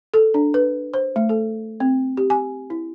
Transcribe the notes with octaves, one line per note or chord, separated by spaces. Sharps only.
A4
D4
B4
C5
A3
A4
C4
G4
G#5
E4